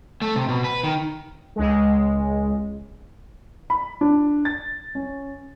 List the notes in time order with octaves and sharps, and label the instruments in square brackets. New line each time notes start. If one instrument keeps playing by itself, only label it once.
[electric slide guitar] A3
C3
B2
B4
D#3
[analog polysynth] C#2 G#3
[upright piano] B5
D4
A6
C#4